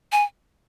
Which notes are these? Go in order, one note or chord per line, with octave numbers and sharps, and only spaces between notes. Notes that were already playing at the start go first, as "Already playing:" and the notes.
G#5